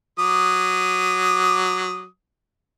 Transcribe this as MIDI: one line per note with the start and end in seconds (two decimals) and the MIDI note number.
0.19 2.06 54
0.19 2.06 86
0.19 2.06 87